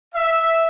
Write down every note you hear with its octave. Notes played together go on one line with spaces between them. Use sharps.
E5